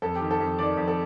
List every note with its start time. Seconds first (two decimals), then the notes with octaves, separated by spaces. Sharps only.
0.02 F2 A4
0.15 G4
0.21 D#3
0.31 A4
0.40 F2
0.58 D#3 D5
0.77 F2
0.88 A4